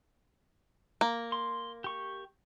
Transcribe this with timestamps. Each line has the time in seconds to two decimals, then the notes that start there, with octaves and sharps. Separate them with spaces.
1.01 A#3
1.32 C6
1.84 G4 C#6